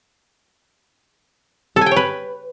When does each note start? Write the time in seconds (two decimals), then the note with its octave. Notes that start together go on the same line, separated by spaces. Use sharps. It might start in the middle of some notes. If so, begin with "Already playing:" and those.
1.76 A4
1.81 G#5
1.86 G5
1.91 C#5
1.96 B4